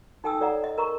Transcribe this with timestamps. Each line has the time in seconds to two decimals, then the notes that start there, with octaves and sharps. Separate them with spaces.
0.24 D#4 A4 G5 G#5 D#6 E6
0.40 A4 C#5 D5 F#5 A#5
0.64 D#5
0.78 A#4 A#5 C#6